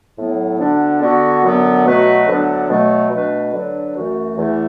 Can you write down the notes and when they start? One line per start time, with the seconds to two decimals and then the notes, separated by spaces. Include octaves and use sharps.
0.18 A2 F#3 B3
0.59 D2 D3 B3 D4
1.02 D3 B3 F#4
1.44 F#2 D3 F#3 B3
1.85 B2 F#3 A3 F#4 B4
2.28 D2 D3 F#3 B3 D4
2.69 B2 F#3 A3
3.11 B2 A3 D4 B4
3.53 D3 F#3 D4 B4
3.95 F#2 E3 A3 F#4
4.37 E2 E3 A3